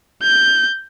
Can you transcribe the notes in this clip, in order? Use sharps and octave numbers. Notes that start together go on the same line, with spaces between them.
G6